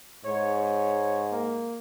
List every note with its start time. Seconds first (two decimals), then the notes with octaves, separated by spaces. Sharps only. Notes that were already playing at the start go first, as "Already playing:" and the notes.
0.25 G#2 C#5
0.56 C#5
1.31 A#3